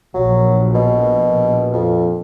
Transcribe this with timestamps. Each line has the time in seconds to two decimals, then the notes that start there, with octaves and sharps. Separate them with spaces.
0.14 A#1 F#3
0.74 B2
1.73 F2